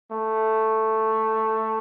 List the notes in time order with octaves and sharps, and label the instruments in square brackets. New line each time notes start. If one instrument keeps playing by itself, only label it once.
[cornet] A3